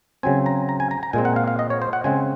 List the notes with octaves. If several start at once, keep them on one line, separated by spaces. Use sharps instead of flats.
C#3 F#3 C4 G#5
A#5
A#5
G#5
A#5
A#5
A#2 G#3 C4 G#5
F#5
F5
F5
D#5
C#5
C5
F#5
C#3 G#3 C4 G#5